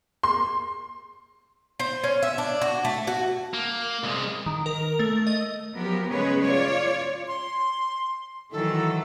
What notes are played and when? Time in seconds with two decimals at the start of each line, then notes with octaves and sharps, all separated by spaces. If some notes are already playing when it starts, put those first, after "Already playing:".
0.23 C6
1.80 C5
2.04 C#4
2.22 E5
2.38 D4
2.62 F#4
2.85 A3
3.07 F#4
3.54 A#3
4.04 C2 G#3
4.46 D#3
4.66 A#4
4.99 A3
5.27 D#5
5.74 F3 F#3 B3 G4 A#4
6.11 C#3 G#3 B3 G#4 B4 C#5
6.44 F4 C#5 D5
7.28 C6
8.52 D#3 E3 F#3 A4